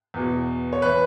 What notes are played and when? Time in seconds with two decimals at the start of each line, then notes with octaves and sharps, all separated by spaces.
0.14 E2 B2
0.73 C#5
0.82 E3 B4